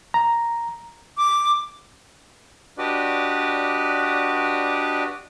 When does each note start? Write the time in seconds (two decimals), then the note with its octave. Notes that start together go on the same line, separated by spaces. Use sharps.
0.14 A#5
1.17 D6
2.78 D4 F#4 G4 B4 D5 D#5